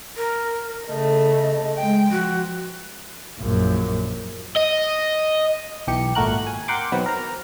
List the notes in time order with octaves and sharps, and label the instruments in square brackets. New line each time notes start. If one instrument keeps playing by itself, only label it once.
[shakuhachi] A#4
[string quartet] C#3 A3 [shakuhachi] D#5
[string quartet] G#3 G5
[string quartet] F3 [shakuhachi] F#4
[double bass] A#1 F#2
[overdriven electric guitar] D#5
[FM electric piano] B1 E3 G4 C#7
G#1 A#2 A3 F#4 A#4 F#6
G#5
A#4 F#5 G5 C6 D6
B2 D#3 F#3 B3 C4 B4
A#4 A#5